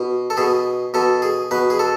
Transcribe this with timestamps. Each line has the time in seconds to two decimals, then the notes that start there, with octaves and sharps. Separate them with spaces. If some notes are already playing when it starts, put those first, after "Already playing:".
Already playing: B2
0.30 A4
0.37 B2 G#4
0.94 B2 A4
1.22 G#4
1.51 B2 B4
1.70 G#4
1.79 A4